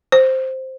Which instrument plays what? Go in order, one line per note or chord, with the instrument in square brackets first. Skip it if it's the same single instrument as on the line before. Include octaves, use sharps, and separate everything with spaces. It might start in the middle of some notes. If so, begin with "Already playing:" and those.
[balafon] C5